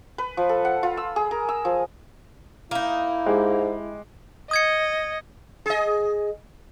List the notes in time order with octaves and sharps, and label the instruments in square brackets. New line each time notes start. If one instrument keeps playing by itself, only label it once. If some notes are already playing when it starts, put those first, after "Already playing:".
[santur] B4
F3
A4
F#5
F4
E6
G#4
A#4
E6
F3
[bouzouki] A#3 D#4 [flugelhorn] E4
[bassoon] G#2 [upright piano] G#3 G4
[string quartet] D#5 [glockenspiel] D#6 G#6 C#7
[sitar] G#4 D#5